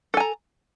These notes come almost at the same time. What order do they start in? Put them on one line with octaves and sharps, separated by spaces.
A4 G#5 A#5